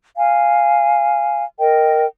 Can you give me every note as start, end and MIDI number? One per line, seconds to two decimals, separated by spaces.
0.17 1.45 77
0.17 1.45 80
1.59 2.05 70
1.59 2.05 75
1.59 2.05 79